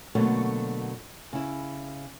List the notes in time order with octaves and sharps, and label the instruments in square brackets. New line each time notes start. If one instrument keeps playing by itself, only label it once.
[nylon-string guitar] B2 D3 F#3 A3 A#3
C#3 E4